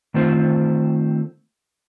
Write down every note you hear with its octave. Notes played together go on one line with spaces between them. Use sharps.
D#3 A3 C4 F4 C5